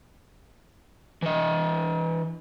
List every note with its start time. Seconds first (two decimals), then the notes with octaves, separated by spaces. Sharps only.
1.22 E3 D#5